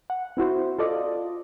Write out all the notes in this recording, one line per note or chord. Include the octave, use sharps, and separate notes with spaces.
F#5
C4 E4 F#4 C5
F4 A4 D5 D#5